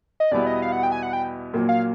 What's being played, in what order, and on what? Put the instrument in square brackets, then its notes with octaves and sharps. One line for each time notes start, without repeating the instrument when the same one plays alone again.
[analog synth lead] D#5
[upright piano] E2 B2 G3 B3 E4 [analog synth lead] D5
[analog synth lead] D#5
F5
F#5
G5
G#5
F#5
G5
[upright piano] A#1 A#2 F#3 A#3
[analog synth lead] F5